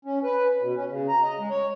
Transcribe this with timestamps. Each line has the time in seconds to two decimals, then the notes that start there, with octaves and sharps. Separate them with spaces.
0.05 C#4
0.23 B4
0.60 B2
0.76 C#4
0.89 C#3
1.08 A#5
1.23 D#5
1.38 G#3
1.50 C#5